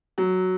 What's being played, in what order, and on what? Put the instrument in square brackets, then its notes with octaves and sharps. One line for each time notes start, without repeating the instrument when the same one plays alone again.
[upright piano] F#3